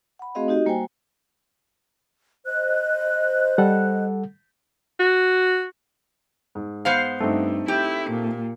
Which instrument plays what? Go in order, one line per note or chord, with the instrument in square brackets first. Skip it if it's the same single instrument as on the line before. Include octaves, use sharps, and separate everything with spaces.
[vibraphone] F#5 B5
A3 C4 F#4 G#4 D#5 F5
D#4 F#4 G4 D#5
G3 A#3 F#4 C5 G5 G#5
[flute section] C5 D#5 F#6
[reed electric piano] G3 A4 F#5
[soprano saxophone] F#4
[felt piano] G#2
[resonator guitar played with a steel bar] B3 C5 F5
[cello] G2 [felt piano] A3 C4 D#4
[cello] E4 [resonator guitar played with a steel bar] G4
[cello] A#2